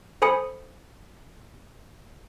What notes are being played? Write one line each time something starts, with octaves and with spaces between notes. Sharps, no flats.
A4 C5 G#5 B5 D#6 C#7